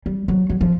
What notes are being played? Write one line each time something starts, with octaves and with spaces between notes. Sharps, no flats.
G3
F#3
F#3
F3